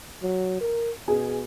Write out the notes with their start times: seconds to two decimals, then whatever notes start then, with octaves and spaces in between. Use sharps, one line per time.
0.23 F#3
0.61 A#4
1.08 B2 G#4